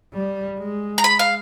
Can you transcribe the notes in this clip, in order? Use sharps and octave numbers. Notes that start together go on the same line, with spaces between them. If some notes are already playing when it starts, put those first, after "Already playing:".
G3
G#3
A#5
B5
F5